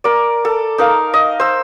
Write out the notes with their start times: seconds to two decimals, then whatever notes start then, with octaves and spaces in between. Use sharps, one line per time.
0.04 A#4 D5
0.45 A4
0.78 D#4 A#4 F5
1.14 D#5
1.40 C5 E6